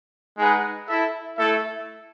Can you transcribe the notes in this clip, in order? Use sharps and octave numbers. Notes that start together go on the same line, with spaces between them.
G#3 D#4 G#4 B4 F#5
E4 A4 E5
A3 E4 A4 E5